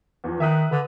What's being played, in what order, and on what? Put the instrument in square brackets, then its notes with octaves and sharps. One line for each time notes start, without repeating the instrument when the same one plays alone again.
[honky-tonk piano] E2 F3
[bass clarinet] D#3 [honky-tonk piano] E5 D#6 F#6
[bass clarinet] D3 [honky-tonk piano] B4